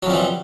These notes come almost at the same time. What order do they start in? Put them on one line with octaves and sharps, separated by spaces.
F#3 F2 G3 E3